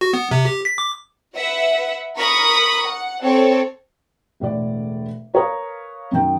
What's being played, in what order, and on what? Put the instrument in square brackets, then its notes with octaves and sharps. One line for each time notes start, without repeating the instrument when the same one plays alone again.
[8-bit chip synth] F#4
B3
C3
G4
B6
D6
[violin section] B4 E5 F#5
A#4 B5 C#6 D#6
F#5
C4 A4 C#5
[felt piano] E1 A2 D3 D5
A#4 B4 C#5 F5 A#5 D#6
F#2 D#3 G5